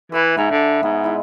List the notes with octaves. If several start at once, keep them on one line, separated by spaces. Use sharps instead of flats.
E3 B4 E5 B5
G#2 E5 G#5
D3
G#2 B3
G#3 E4